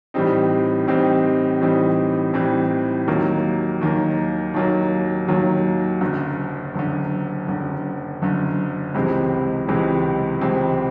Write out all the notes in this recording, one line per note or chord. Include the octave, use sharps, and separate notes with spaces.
A2 E3 G3 C4 D#4
A2 E3 G3 C4 D#4
A2 E3 G3 C4 D#4
A2 E3 G3 C4 D#4
D#2 D#3 F#3 A#3
D#2 D#3 F#3 A#3
D#2 D#3 F#3 A#3
D#2 D#3 F#3 A#3
F#1 F#2 D3
F#1 F#2 D3
F#1 F#2 D3
F#1 F#2 D3
C#2 C3 E3 G#3 C4
C#2 C3 E3 G#3 C4
C#2 C3 E3 G#3 C4